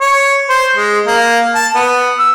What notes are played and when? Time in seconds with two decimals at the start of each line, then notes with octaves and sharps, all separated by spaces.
0.01 C#5
0.49 C5
0.76 G#3
1.07 A#3
1.55 A5
1.74 B3
2.19 E6